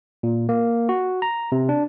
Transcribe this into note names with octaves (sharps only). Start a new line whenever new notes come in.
A#2
A#3
F#4
A#5
C3
D4